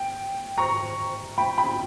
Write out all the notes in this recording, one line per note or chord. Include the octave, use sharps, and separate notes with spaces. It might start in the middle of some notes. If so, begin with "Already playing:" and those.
Already playing: G5
A#5 C#6
G5 B5
G5 B5